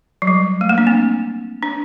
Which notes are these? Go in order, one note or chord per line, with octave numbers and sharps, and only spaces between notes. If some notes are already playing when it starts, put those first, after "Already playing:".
F#3
G3
A3
A#3
D4
C4
D4